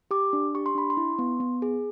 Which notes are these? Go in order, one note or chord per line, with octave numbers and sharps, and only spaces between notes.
G4 D6
D4
G4 C#6
C6
D4 B5
C6
E4
B3
B3
G#4